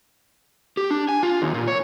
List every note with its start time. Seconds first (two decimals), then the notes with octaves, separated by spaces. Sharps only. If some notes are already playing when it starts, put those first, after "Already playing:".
0.77 G4
0.91 D4
1.09 G#5
1.23 F4
1.42 D#2
1.54 A#2
1.68 C#5